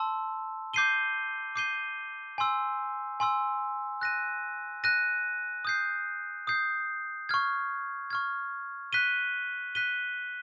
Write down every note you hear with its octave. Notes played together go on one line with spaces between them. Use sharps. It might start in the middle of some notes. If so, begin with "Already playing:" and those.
Already playing: A5 C6 E6
D6 G6 C7 D#7 G7
D6 G6 C7 D#7 G7
G#5 C6 E6
G#5 C6 E6
F#6 A#6 D#7
F#6 A#6 D#7
D#6 G6 C7
D#6 G6 C7
C#6 F6 G#6
C#6 F6 G#6
F#6 B6 D#7 G7
F#6 B6 D#7 G7